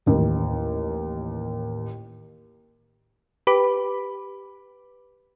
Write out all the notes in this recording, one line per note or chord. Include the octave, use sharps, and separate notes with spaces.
A1 D#2
G4 B4 B5 D6